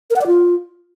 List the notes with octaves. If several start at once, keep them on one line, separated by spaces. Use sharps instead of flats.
A#4
F#5
D5
F4